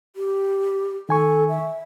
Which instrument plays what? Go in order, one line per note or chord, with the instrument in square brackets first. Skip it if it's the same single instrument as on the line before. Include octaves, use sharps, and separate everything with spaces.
[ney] G4
[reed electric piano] D#3 G#5 C#6 [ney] A4
[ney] E5